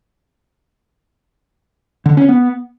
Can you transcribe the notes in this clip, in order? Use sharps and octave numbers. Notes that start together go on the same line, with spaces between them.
D3
C#4
B3